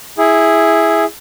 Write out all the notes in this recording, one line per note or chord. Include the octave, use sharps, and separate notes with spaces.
E4 G#4